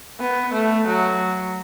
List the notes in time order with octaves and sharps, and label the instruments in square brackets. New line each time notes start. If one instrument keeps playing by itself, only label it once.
[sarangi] B3
A3
F#3